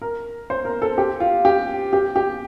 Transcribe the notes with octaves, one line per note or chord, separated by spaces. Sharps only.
A#4
C5
A#4
A4
G4
F4
G4
G4
G4